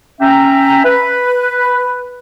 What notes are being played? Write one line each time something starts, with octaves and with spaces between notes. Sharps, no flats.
C#4 E5 G5 A#5
B4